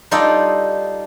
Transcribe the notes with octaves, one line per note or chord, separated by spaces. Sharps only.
G3 D#4 F4 A4 D5